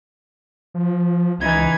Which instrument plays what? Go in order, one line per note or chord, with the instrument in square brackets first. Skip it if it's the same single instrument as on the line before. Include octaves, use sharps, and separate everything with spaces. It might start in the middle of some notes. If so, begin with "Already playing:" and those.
[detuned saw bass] F3
[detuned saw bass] C#2 [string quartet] E3 D#4 G#6